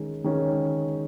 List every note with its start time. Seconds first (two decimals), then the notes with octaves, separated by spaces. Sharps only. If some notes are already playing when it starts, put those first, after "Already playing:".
Already playing: D#3 G#3 C#4
0.24 D#3 G#3 C#4